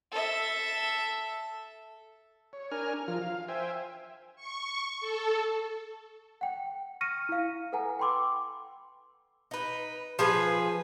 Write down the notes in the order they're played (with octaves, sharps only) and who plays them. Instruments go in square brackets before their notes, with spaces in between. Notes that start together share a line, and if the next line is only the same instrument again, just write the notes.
[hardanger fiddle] A4 E5
[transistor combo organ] C#5
D4 A#4 G#5 F6
F3 F4 A#4 F6
F4 F5
C5 E5 G5 G#5
[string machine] C#6
A4
[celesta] F#5 G5
C#6 F6 A#6 C#7 D#7
E4 F5
A4 B4 F#5 G#5 A#5
G5 B5 C6 D6 E6
[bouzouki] D#4 B4
F3 G#4 B4